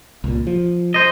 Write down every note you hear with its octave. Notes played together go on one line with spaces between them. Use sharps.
C2 A#2
F3
C5 D#5